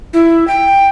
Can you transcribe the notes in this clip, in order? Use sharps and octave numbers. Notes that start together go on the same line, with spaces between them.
E4
G5